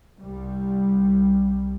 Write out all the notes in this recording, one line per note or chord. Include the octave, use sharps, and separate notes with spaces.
C2 G3